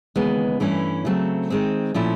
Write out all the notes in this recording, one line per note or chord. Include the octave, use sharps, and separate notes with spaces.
D#2 C#3 E3 G#3 B3
G2 E3 A3 C#4 E4
C#3 F#3 A3 C4
D#3 G#3 C4
A#2 F3 A3 C#4 E4